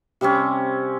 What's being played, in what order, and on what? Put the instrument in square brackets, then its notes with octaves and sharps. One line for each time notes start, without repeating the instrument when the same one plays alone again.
[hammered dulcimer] C3 G3 C4 C#4